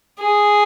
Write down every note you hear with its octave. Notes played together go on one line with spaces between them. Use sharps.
G#4